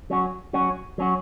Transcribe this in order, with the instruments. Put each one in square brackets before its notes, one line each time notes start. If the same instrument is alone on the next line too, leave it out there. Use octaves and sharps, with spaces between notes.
[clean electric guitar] F#3 C#4 F#4
F#3 C#4 F#4
F#3 C#4 F#4